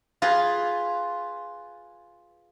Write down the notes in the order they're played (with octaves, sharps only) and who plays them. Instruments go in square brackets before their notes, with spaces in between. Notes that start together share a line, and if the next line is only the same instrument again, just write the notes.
[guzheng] F4 G#4 B4